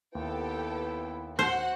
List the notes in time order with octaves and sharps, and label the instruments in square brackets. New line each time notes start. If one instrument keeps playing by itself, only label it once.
[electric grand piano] D#2 [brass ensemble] B3 E4 B4 [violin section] G4 A4 G5
[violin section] F#4 F#5 [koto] C5